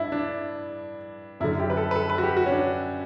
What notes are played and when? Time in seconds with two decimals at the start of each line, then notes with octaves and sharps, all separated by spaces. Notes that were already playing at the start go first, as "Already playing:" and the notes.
Already playing: G2 D4 E4
0.12 D4
1.40 F#2 E4
1.44 D3
1.60 G4
1.70 B4
1.77 A4
1.91 B4
1.96 A4
2.10 B4
2.18 F#4
2.23 G4
2.37 F#4
2.46 C#4
2.51 D4